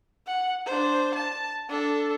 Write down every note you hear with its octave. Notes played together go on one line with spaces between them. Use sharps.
F#5
D4 C5
A5
D4 A4